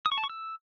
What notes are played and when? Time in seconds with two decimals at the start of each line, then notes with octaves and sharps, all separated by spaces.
0.06 D#6
0.12 C#6
0.18 A5
0.24 C#6
0.30 E6